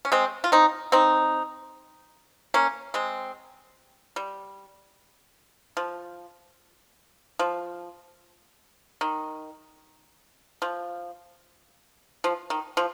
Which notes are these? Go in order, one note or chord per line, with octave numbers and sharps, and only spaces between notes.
C#4
G#3 C4
F4
C4 D#4
C4 D#4
A#3 C#4
G#3 C4
G3
F3
F3
D#3
F3
F3
D#3
F3